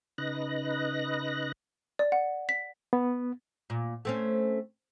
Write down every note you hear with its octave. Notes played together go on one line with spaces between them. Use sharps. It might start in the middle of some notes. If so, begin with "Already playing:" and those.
C#3 D#4 B4 D#5 F#6 A#6
D5
F#5
B6
B3
A#2
A3 C4 C#4